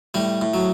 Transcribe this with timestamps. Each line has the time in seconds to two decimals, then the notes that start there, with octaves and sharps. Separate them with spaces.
0.14 A2 G3
0.41 A2
0.54 F#3